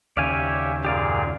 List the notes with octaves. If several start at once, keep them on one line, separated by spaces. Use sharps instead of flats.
D#2 C#3 G4 C#5 D5 E5 F5 G#5
F#2 A#2 G4 G#4 D5 F5